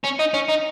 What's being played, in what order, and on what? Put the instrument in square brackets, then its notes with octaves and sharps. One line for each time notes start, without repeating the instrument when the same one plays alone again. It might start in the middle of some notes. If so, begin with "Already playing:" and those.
[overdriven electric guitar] C#4
D#4
C#4
D#4